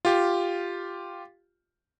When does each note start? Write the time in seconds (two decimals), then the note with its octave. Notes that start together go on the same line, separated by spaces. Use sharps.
0.05 F4 G4